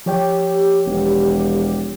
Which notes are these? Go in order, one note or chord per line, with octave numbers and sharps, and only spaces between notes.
F3 G4 C#5 G5
E1